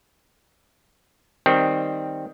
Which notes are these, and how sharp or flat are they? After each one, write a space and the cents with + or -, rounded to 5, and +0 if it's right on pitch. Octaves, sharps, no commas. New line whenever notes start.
D#3 +0 G3 +0 C4 +0